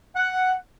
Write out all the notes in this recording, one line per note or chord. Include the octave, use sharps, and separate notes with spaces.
F#5